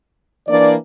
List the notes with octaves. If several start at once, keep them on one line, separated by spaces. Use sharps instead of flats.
E3 A#3 D4 D5